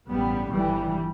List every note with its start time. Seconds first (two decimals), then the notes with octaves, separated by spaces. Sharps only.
0.10 A1 G2 G3 B3
0.53 G1 G2 E3 G3